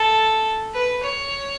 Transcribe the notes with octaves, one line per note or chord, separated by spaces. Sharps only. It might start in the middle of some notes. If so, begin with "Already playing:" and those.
Already playing: A4
B4
C#5